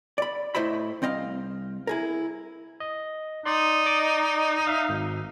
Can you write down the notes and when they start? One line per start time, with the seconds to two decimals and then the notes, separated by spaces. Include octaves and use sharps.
0.18 D5 B5
0.55 A2 E4 C5 D#5 E5 B5
1.02 C2 C4 D#5 F5
1.87 E4 G#4 A#4
2.80 D#5
3.45 D#4 D5 C6
3.86 D5 D#5 D6
4.67 E5 F5
4.89 G#1